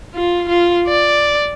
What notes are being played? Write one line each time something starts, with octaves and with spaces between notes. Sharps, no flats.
F4
F4
D5